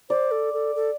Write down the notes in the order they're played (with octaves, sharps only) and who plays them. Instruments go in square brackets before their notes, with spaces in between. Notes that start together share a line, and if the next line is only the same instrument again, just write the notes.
[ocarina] C5 [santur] D5
[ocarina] A4
A4
A4